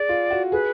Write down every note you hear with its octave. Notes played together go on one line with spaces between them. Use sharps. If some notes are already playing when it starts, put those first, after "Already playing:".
Already playing: G#4 D5
F4
F#4
G#4 B4